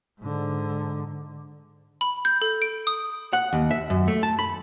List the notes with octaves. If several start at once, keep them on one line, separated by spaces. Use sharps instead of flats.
G#2 D3
B5
G6
A4
D7
D#6
F#5
D#2
E5
F#2
A3
A5
B5